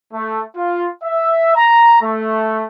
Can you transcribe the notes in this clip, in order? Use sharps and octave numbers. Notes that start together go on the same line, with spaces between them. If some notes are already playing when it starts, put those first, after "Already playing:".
A3
F4
E5
A#5
A3